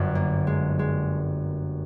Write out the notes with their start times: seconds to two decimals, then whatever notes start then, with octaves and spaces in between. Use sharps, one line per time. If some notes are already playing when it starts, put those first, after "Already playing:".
Already playing: G1 F#2 D3
0.15 A#3
0.47 G#3
0.79 G#3